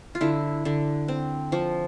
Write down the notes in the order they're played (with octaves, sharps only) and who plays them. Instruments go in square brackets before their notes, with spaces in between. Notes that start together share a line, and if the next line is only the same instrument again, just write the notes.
[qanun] F4
D3 E4
D3
C4
F3